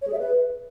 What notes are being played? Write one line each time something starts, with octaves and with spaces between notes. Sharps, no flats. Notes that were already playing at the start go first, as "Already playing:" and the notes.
C#5
G#4
E5
B4